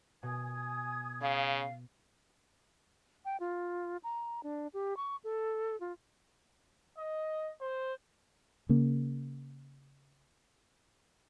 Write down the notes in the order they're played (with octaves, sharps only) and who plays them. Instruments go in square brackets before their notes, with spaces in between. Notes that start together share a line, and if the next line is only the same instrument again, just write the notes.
[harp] B2 [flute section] G#5 D#6 G#6
[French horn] C#3 [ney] F5
[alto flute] G5
F4
A#5
D4
G4
C#6
A4
F4
[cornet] D#5
C5
[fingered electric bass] C#3 A#3